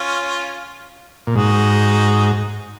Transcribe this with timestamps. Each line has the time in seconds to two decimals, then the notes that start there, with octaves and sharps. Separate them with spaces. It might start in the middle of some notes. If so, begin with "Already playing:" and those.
Already playing: C#4 F4
1.27 A#2
1.35 G#2 D#4 F#4